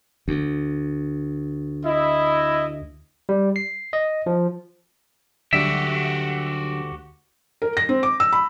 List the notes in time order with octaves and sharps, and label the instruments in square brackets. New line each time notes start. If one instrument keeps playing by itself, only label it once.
[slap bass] D2
[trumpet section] E4 D#5
[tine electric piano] G3
C7
D#5
F3
[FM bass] D2 [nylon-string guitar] D3 F#3 G3 [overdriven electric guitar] F#4 G4 [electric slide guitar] E5
[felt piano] A#4
A#6
C4
D6
E6
B5